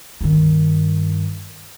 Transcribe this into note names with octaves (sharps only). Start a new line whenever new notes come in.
G2 D#3